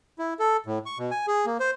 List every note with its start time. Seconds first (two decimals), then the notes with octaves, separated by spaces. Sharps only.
0.19 E4
0.39 A4
0.66 A2
0.86 C#6
0.99 B2
1.11 G#5
1.28 G#4
1.46 A#3
1.60 C5